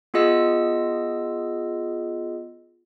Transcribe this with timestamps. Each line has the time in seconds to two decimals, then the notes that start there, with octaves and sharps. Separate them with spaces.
0.14 B3 F4 G#4 D#5 E6